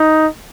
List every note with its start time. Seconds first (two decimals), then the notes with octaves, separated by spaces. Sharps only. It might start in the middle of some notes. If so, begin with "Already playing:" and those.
Already playing: D#4